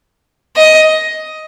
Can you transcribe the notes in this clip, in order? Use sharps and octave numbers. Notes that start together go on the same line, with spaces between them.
D#5